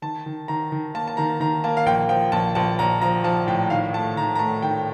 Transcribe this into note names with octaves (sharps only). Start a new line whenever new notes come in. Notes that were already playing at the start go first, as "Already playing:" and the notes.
D#3 A5
D#3
D#3 A#5
D#3
A#3 A5
A5
D#3 A#5
D#3 A#5
A#3 A5
F5
A#1 G5
F3 G5
A#1 A5
A#1 A5
A#1 A#5
F3 A#5
F3 A5
A2 G5
D#3 F5
A3 A5
D#3 A#5
A#5
A3 A5
D#3 G5